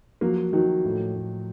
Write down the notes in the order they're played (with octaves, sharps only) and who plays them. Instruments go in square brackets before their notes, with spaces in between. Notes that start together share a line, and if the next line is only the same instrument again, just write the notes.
[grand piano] F3 [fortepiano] F#3 A#3
[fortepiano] D#3 F#3 [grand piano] F3
[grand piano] A2
A2